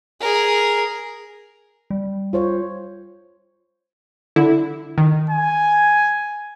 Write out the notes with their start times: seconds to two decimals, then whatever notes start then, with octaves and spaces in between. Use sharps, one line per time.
0.21 G#4 A#4
1.90 G3
2.33 F4 C5 C#5
4.36 D3 E4
4.98 D#3
5.30 G#5